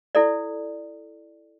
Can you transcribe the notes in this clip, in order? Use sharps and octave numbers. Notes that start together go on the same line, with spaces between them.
E4 A4 D5